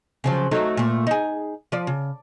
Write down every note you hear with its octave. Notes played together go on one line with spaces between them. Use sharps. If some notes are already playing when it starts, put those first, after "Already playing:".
C#3 F3 F#3
F#3 A3 D#4
A#2 A3
D#4 G#4
F3 D5
C#3